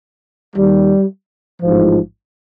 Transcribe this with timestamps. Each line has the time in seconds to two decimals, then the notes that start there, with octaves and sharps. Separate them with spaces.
0.56 D#2 D#3 G3
1.62 A1 G#2 F3